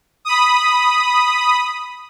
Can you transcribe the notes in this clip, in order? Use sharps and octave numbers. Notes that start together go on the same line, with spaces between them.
B5 D#6